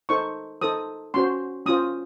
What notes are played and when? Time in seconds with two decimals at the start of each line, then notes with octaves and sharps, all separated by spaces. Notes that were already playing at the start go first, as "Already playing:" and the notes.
0.09 D#4 A4 C5 C#6
0.61 D#4 A4 C5 D#6
1.14 C#4 F#4 C5 C6
1.66 C#4 F4 C5 D#6